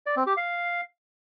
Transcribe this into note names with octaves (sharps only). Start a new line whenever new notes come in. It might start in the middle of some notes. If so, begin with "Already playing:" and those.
D5
C4
G4
F5